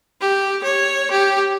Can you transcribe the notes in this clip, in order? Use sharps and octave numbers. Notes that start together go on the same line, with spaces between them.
G4
C#5
G4